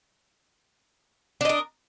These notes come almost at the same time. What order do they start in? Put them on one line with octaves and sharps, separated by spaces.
D4 D#5 A#4